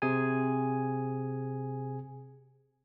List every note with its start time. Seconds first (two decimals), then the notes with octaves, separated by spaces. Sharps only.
0.02 C3 G#4 G#5